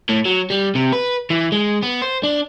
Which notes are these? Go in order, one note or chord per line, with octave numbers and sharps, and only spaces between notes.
A2
F#3
G3
C3
B4
E3
G#3
B3
C5
D4